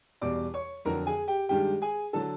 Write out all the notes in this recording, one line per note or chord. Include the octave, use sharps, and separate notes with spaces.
E2 B2 G3 D5 D6
C#5 C#6
F2 D3 F#3 A#4 A#5
G#4 G#5
G4 G5
G2 D#3 G#3 G4 G5
G#4 G#5
D3 F#3 A4 A5